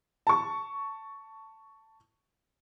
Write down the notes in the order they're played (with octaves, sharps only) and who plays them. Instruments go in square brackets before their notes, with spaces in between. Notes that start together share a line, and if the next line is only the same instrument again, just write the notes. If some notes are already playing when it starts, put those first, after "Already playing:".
[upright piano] A5 C#6